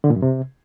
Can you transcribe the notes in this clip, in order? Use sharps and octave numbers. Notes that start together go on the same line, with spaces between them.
D3
A#2
F#2
C3